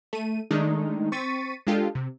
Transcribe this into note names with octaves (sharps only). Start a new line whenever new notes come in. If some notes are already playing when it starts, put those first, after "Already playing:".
A3 D#7
D#3 G#3 A3 D4 D#4
C4 C#6 A6 B6 D#7
G#3 D4 F4 G4 A4
C3